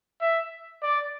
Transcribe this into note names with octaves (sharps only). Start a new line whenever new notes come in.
E5
D5